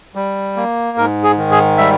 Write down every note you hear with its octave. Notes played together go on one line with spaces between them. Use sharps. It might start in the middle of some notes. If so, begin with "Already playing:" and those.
G3
A#3
G#2 A#4
G#4
D#3
G#4
G3 E5